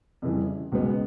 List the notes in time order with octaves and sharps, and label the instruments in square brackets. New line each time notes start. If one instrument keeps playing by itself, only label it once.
[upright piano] F2 C#3 E3 G3
C#2 B2 G#3 B3